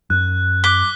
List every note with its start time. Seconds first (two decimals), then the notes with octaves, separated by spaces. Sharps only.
0.10 F#2 F#6
0.64 D6 F#6 B6 G7